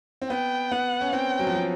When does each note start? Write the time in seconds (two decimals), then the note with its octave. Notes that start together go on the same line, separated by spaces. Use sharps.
0.22 C4
0.30 B3 G5
0.71 B3 F#5
1.01 C#4
1.13 C4 G5
1.39 F#3
1.47 F3
1.55 F#3